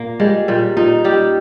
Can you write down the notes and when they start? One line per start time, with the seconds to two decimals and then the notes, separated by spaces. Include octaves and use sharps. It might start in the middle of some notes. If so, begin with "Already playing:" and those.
Already playing: A#2 A#3
0.20 G3 G#3
0.48 A#2 G3
0.77 A#2 D#4
1.04 G3 G4